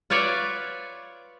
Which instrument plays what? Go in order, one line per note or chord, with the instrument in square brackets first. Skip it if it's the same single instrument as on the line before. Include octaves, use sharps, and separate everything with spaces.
[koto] F4 B4 C#5 D5 E5 F#5